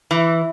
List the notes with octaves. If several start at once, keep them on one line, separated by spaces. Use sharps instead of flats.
E3